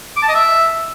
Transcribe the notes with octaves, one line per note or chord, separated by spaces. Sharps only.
D6
A5
D#5
E5